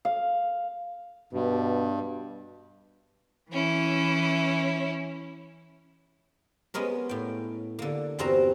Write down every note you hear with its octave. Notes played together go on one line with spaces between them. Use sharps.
F5
G2 B2
E3 C#4 E4
G#3 B3 C#4 A#4
A2 G5
D3 A#3
E2 G2 C4 F#4 C5 A#5